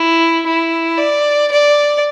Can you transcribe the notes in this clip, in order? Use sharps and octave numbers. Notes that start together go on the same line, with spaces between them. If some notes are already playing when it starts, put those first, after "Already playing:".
Already playing: E4
E4
D5
D5